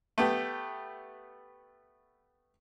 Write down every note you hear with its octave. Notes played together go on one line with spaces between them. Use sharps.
A3 B3 G4